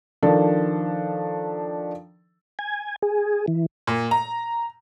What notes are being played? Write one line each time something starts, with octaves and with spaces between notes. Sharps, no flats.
D#3 F3 D4 A4
G#5
G#4
E3
A#2
A#5